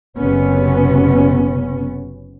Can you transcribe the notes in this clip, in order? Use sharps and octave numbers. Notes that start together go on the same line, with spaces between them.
F#1 C3 B3 C#4